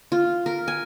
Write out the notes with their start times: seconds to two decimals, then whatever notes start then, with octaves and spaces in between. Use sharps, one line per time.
0.12 F4
0.46 A#4
0.68 G#5